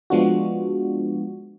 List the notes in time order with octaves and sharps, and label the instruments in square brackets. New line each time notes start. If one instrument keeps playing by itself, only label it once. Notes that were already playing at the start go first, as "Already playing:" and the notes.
[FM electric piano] F3 G#3 B3 D4 F4 F#4